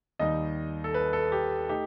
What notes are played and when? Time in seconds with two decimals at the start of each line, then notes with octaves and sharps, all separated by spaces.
0.19 D#2 D#3 G3 D#4 D#5
0.84 A4
0.94 B4
1.13 A4
1.32 G4
1.69 A3 D#4 G4